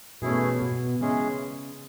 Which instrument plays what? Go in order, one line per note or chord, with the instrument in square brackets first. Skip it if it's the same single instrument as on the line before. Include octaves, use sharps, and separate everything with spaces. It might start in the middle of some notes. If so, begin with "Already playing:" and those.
[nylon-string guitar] B2 [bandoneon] E3 A3 C#4 E4 G#4
[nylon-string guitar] B2
[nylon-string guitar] C#3 [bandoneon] E3 G#3 C#4 G#4